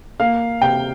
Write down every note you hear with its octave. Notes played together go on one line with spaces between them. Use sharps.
A#3 F5
C3 G5